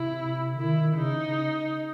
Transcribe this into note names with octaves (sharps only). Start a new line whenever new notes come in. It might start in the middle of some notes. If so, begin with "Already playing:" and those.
Already playing: C3 E4
D#3 E4
C#3 D#4